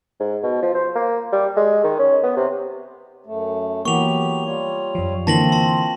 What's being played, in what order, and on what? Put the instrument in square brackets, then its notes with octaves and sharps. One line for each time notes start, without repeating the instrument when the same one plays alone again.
[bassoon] G#2
B2
F3
C5
A#3
G3
G#3
D#3
C#4
B3
C3
[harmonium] F#2 A3
[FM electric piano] E3 A#3 [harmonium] F#3 B3 G4 [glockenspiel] C#6 F7
[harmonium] G3 F4 C#5
[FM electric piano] F#2 F3
[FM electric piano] D3 E3 A#3 [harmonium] C4 F4 [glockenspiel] A5 A#6 F#7
[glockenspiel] A5 C6